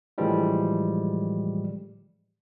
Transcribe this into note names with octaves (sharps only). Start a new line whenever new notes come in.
A2 D3 E3 F3 G3 G#3